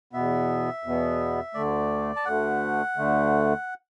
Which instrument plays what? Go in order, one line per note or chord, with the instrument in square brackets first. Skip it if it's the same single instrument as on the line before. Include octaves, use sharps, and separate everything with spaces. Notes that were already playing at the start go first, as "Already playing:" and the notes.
[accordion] E2 B2 B3 [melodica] E5
[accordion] E2 B2 B3
[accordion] D2 D3 A3 [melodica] D5
[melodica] A5
[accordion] D2 D3 A3 [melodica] F#5
[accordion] D2 D3 A3